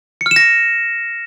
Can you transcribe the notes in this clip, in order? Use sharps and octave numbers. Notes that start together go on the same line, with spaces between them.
C#7
F6
E7
A#6